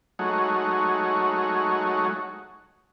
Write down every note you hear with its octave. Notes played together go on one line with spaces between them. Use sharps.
F#3 G#3 A3 D#4 F#4 C#5